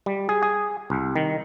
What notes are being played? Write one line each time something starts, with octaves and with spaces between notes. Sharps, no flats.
G3
G#4
G#4
C2
D#3